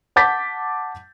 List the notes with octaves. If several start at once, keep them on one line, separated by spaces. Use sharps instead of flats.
F#5 A5 D6 G6 A6 B6